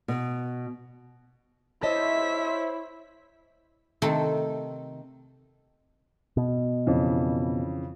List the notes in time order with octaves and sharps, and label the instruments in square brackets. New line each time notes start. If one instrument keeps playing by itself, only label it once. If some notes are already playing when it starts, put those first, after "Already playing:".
[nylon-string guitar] B2
[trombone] E4 [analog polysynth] C5 C#5 [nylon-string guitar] D#5 A5 [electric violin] E5 B6
[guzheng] C3 D#3 A3 C4 A4
[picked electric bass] B2
[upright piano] F2 C#3 E3